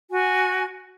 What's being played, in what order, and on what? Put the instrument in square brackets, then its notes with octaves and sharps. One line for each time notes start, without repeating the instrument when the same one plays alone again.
[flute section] F#4 G#5